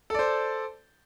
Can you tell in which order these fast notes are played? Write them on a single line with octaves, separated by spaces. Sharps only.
A4 D5 C5